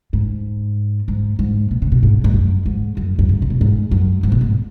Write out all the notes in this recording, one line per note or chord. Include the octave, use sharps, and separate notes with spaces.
G#2
G#2
G#2
B2
C#3
B2
G#2
G#2
F#2
G#2
F#2
F#2
G#2
C#3
B2
G#2
F#2
G#2
B2
G#2